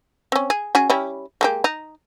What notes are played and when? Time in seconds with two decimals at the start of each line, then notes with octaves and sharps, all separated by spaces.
0.32 C4 C#4
0.50 G#4
0.75 C#4 F#4 G#4
0.90 G3 C#4 E4
1.41 G#3 A#3 G4
1.64 D#4